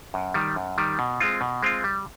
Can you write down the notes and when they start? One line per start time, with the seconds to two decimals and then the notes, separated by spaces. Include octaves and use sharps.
0.14 F#2
0.34 D#3 G3
0.56 F#2
0.78 D#3 G3
0.99 B2
1.20 G#3 C4 F4
1.41 B2
1.63 G#3 C4 F4
1.84 G3